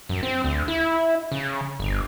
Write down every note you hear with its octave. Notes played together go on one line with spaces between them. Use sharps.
F#2
C4
D2
E4
C#3
G1